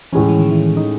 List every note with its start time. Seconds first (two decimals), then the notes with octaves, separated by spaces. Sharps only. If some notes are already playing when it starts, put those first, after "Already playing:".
0.12 A2 E3 G#3 C#4
0.29 E3
0.39 D#3
0.51 E3
0.77 D#4